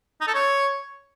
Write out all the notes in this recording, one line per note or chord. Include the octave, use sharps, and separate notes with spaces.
D#4
A4
C#5